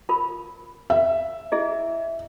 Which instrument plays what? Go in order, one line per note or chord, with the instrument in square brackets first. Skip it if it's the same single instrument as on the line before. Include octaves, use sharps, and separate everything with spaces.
[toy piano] F4 A#4 B5
[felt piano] E5
[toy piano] E4 G#4 D#5